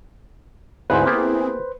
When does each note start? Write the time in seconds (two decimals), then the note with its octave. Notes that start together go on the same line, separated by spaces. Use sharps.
0.90 D2 G#2 C4 E4 G#4 B4 C5
1.07 A#3 B3 G4